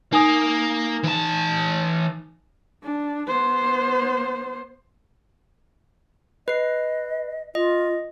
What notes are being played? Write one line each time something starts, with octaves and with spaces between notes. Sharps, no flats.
A#3 D#4 G#5 D#6
E3 A5
D4
B3 C5
B4 D#5 C7
F4 D#5